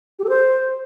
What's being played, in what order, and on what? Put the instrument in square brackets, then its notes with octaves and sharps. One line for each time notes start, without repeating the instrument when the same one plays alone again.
[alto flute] G4
A4
C5